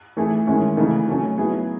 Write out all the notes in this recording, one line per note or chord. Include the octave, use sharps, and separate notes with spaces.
E3 A3 E4 G#4
D#3 G#3 C#4 E4
C#3 E3 A3 D#4
F#3 A3 C#4
F#3 B3 E4 G#4